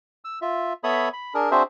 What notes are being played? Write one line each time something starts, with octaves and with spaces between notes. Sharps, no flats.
E6
F4 E5
B3 A4 C#5 E5 B5 D#6
B5
D4 G#4 A#4
C4 D4 F#4 G#4 C5 E5